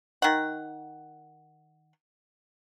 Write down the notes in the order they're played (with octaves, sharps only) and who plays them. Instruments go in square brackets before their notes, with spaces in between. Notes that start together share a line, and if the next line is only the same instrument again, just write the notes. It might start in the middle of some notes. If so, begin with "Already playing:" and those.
[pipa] D#3 F#5